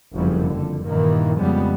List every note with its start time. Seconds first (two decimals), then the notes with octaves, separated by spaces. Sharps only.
0.14 F#1 F2 C#3 F#3 G3
0.48 F2 D3
0.86 G2 A#2 D#3 E3 A#3
1.37 F2 C#3 G3 G#3 B3